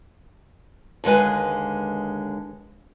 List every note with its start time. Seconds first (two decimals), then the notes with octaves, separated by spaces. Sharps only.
1.04 D#2 D3 G#3 B4 G#5